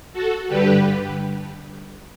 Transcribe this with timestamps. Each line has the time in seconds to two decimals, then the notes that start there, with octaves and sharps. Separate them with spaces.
0.13 F#4 A4
0.47 G2 D3 G3 G4 B4